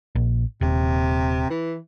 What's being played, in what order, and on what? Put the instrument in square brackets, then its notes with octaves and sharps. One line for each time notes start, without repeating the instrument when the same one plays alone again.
[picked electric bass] A#1
[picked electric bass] D#1 [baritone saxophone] C3
[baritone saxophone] E3